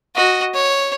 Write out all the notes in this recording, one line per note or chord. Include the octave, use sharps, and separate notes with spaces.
F#4 D#5
C#5